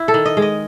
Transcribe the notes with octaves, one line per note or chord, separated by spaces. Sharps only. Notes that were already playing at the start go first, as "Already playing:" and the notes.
Already playing: E4
A4
D#3
D#5
G#3
D#5